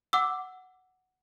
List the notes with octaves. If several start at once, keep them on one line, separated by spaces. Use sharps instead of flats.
F#5 D6 E6